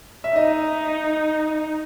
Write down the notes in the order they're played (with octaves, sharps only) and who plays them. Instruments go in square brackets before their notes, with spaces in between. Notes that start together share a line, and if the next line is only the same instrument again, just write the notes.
[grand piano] E5
[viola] D#4 [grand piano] D#5